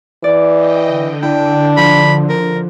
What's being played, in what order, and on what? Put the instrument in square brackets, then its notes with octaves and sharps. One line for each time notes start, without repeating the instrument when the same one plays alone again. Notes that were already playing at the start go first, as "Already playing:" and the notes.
[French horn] E3 [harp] D5
[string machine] D#5 G5
D3
[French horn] D4 [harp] E4 [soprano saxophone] G5
[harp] F3 [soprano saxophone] B5
[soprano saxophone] A#4